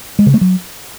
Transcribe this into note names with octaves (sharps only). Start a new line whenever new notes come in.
G#3
C#3
A3
F#3